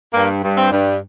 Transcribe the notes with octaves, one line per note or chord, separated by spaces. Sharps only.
G2 A#3
G2
C4
G2